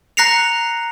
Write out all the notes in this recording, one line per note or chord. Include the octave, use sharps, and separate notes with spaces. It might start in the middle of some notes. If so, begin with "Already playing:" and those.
A#5 F#6 A#6 C7 C#7 F7